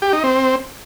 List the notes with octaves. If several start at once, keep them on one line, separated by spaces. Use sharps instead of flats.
G4
D#4
C4